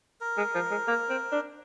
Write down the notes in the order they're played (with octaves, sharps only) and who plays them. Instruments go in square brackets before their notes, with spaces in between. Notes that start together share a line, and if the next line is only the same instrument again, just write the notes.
[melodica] A#4
[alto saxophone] G#3
F3
G#3
A#3
C4
D4